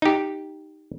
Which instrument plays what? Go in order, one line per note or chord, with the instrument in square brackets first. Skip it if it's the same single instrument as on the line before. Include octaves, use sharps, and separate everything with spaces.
[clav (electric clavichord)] D#4 G4